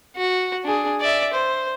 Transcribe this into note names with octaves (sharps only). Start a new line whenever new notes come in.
F#4
D4 G#4
D5 E5
C5